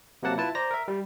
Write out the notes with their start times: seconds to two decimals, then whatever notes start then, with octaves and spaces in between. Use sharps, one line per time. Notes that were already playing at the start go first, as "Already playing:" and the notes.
0.23 C3 F#3 A#3 F#5 A5
0.38 E4 F4 B4 A5
0.55 C5 D5 A#5 A#6
0.71 A#4 E5
0.88 G3